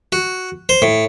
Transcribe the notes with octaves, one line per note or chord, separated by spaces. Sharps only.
F#4
C5
A2